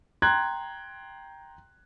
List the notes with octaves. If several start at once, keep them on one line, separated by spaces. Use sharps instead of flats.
G5 A#5 C6 F#6 G#6